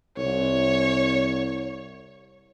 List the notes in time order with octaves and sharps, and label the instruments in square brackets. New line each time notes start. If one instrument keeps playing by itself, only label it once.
[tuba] C2 [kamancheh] C#5